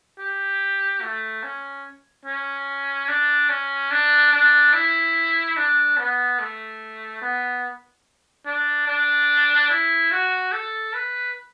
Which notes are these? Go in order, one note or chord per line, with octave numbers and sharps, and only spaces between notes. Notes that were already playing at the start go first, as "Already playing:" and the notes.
G4
A3
C#4
C#4
D4
C#4
D4
D4
E4
D4
B3
A3
B3
D4
D4
E4
F#4
A4
B4